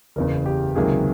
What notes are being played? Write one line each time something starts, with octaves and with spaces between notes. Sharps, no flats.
F#1 E2 C#3 A#4
G4
C#2 C3 D#3 F#3 A#3 G#4